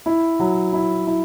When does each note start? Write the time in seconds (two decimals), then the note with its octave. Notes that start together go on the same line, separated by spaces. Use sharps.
0.06 E4
0.39 F#3
0.73 E4
1.07 E4